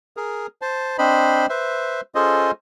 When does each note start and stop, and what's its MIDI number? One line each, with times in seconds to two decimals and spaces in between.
0.17 0.47 68
0.17 0.47 70
0.62 0.97 72
0.62 0.97 81
0.98 1.46 60
0.98 1.46 62
0.98 1.46 72
0.98 1.46 75
0.98 1.46 83
1.49 2.01 71
1.49 2.01 72
1.49 2.01 76
2.15 2.51 61
2.15 2.51 65
2.15 2.51 68
2.15 2.51 69
2.15 2.51 72
2.15 2.51 75